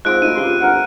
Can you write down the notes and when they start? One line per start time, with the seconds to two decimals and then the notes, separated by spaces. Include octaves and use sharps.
0.05 G#2 F3 C4 D#5 F#6 D7
0.22 D2 D#4 E4 D#7
0.36 C#2 F4 G4 C6
0.60 G1 A#4 F#5